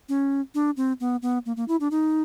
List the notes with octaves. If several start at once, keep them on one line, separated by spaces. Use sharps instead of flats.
C#4
D4
C4
B3
B3
A#3
A#3
E4
D4
D#4